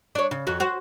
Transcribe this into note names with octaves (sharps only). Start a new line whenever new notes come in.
D4 C#5
C#3
F2 F#4
F#4 C5